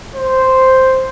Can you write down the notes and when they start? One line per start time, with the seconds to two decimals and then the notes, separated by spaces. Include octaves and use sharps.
0.15 C5